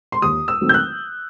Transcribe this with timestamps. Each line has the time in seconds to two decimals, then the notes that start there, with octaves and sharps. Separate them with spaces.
0.12 C6
0.22 D#2 D#6
0.48 E6
0.61 D#3 F#3 A3 C4
0.69 G6
0.74 F#6